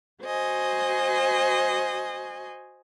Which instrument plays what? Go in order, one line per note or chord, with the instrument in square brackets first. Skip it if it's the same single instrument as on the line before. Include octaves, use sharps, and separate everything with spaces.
[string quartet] F#4 C5 D#5 G#5